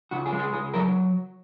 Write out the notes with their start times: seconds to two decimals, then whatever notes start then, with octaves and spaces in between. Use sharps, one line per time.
0.11 C#2 F#4
0.26 G#4
0.33 G#3
0.39 G#4
0.53 C#2 G#4
0.74 F#3 A#4